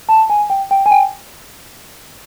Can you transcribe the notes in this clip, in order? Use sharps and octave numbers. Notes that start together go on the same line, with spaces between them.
A5
G#5
G5
G5
G#5
G5